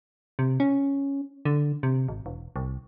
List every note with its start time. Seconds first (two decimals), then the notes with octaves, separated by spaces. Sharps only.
0.39 C3
0.60 C#4
1.45 D3
1.83 C3
2.08 G#1
2.26 E1
2.56 C2